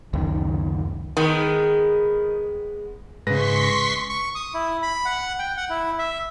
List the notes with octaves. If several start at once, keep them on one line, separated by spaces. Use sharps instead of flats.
C#2 F#2 D#3
D#3 G#3 B3
G#2 C#3 G#3 B4 C6 C#6 A#6 B6
C#6
D#6
E4
B5
F#5
G5
F#5
E4
E5